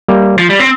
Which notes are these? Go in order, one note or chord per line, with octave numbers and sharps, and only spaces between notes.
G3 A#3
F3
G3
C4